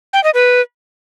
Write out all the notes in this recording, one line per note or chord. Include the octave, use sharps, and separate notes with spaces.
G5
D#5
B4